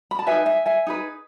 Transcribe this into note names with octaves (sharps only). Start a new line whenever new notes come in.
B5
A5
D#4 G#4 B4 E5 G#5
E5 G#5
E5 G#5
D#4 G#4 B4